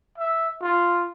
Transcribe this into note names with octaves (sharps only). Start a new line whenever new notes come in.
E5
F4